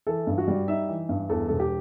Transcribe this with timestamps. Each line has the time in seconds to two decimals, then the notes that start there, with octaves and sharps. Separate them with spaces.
0.07 E3 A4
0.27 G2
0.38 F#4
0.48 G3
0.68 D#4 E5
0.89 E3
1.09 G2
1.29 E2 A4
1.48 E1 A4
1.60 G4